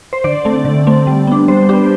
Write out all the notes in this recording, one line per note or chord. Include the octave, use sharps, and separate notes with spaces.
C5
D3 D5
A3 C4
D3
A3 C4
G3
B3 D4
G3 C5
B3 D4 G4